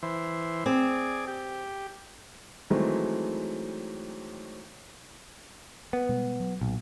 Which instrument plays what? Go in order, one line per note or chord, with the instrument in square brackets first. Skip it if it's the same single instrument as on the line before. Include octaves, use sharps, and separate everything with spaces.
[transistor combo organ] E3 C5
[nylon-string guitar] C4 [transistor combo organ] G#4 D5
[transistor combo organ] G4
[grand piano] D#3 E3 F#3 G#3 A3 C4
[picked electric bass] B3
[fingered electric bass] B2 G3 G#3
F#3
[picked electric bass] B1 [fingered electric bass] A#2